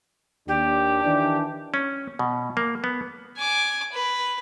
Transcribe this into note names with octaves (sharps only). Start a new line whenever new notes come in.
D#2 D4 G4
D#3 E3 D4
C#4
B2
A#3
B3
G#5 D6
B4